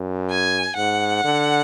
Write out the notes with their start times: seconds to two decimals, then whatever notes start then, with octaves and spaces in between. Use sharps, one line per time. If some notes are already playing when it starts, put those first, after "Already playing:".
Already playing: F#2
0.30 G#5
0.77 G#2 F#5
1.24 D3